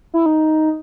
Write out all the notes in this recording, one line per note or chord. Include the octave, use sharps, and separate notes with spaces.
E4
D#4